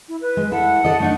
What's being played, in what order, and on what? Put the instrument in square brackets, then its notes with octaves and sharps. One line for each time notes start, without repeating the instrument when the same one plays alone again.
[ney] E4
B4
[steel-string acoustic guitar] G#3
[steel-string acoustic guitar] E4 A4 [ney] F#5
[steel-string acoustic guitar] A4 D5 D#5
A3 D4 D#4